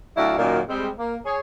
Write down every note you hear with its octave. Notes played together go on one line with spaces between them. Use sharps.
D2 F#3 E4 F#4 D5 F5
F#2 A#2 D#3
G3 G#3 C4
A#3
G#4 C#5